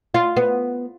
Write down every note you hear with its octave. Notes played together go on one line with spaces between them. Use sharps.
F4
B3